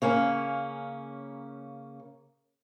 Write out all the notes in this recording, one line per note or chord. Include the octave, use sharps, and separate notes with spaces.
C#3 A#3 C#4